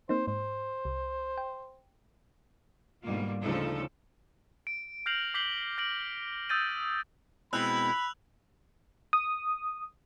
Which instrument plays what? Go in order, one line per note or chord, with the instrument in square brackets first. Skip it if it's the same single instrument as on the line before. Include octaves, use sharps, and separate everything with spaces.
[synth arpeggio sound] A#3 C4 D#4 [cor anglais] C5
[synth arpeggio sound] G#2 [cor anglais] C5
[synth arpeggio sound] C2
G5
[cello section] G#2 B2 D3 G3 A#3 F4
D2 C#3 F3 D4 D#4 A4
[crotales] D7
F6 G6 A#6 C7 F7 F#7
D6 G6 B6 C7 F#7 G7
F6 A#6 D7 F#7
D#6 E6 G6 A6 A#6 D#7
[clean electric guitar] B2 G#3 C4 [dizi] E4 [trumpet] B5 [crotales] E6 F#6 F7
[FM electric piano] D#6